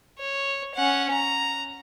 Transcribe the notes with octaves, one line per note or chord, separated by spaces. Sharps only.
C#5
C#4 F#5
A#5